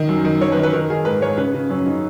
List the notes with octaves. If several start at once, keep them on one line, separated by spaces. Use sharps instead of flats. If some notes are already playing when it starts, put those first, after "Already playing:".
Already playing: D#3
F#2
D#3
F#2 C#5
B4
D#3
B4
D#3 A#4
D#3 G#4
G#2 B4
G#2 C#5
C#3 B4
C#3
F#2 C#4
C#3 D#4